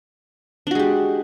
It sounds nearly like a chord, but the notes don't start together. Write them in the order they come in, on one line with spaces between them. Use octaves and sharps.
D4 F#4 G#3 G4